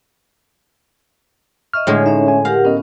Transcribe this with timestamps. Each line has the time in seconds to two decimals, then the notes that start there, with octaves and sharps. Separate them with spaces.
1.73 D#5 E5 C#6 F6
1.87 A2 D3 G#3 C#5
2.06 C#4 D#4 C#5 E5
2.28 G#5
2.45 G4 A#4 F5 F#5
2.65 B3 C#4 A#4 D#5